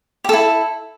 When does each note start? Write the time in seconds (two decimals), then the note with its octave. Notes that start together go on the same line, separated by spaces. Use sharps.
0.24 G4
0.29 A4
0.33 E4